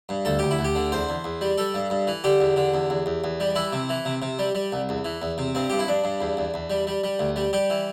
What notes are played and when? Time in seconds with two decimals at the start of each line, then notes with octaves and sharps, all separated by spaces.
0.09 G2
0.25 D2 A4
0.39 D2 G4
0.51 E4
0.59 D2
0.65 G4
0.75 D3
0.92 E2 C5
1.09 E2
1.24 E2
1.41 G3
1.58 G3 A4
1.74 G2
1.90 G2
2.07 E3
2.24 D3 G4
2.41 E2
2.56 D3
2.74 E2
2.90 E2
3.06 E2
3.24 E2
3.40 G3
3.56 E3 E4
3.73 C3
3.89 E3
4.05 C3
4.22 C3
4.39 G3
4.55 G3
4.72 C2
4.89 E2
5.05 E3
5.22 E2
5.38 C3
5.55 G2 C4
5.70 G2 G4
5.79 E4
5.87 G2 D4
6.04 G2
6.21 E2
6.37 E2
6.54 E2
6.70 G3
6.87 G3
7.04 G3
7.19 D2
7.36 G3
7.53 G3 G4
7.70 E3